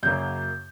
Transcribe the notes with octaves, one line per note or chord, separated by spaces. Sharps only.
F#2 C#3 F#3 A#3 G6